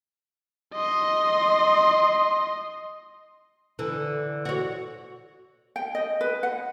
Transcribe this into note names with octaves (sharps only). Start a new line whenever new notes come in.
D#5 C6
D3 E3
F#4 C#5
G5
D#5
B4
F#5